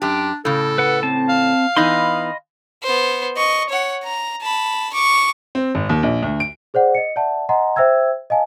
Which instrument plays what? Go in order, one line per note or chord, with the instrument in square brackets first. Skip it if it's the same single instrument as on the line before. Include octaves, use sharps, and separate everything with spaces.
[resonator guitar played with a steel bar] F#2 G4 [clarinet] D4
[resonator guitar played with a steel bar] A2 C#3 [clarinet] A4
[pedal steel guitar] B4 F#5
C4 A5
[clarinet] F5
[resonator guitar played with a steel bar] E3 B3 D#4 [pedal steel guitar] D#5 B5 C6
[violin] B3 C5
D#5 C#6
C#5 F#5
A#5
A5 B5
C#6 D6
[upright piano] C4
G#1
D#2
A#1
D2
D7
[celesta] G#4 C5 D5 F#5
D#5 C#7
D5 E5 F#5 A5
D#5 F#5 G#5 A#5 C6
C5 E5 G5 E6 G#6
D#5 F5 G#5 A5